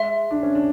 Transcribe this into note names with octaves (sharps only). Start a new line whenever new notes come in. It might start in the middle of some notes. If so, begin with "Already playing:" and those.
Already playing: G#3 E5 C6
D4
C#4
D4